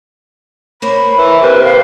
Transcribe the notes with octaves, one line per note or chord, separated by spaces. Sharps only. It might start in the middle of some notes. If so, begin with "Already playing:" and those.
A#3 C5 C#5 B5
E3
C3 A#4 B4
B4 F5